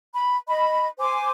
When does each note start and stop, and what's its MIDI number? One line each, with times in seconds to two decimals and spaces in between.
0.13 0.36 83
0.47 0.87 75
0.47 0.87 83
0.99 1.31 72
0.99 1.31 80
0.99 1.31 86